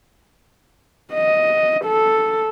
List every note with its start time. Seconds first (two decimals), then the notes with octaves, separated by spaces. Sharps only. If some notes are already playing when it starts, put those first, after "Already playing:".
1.14 D#5
1.85 A4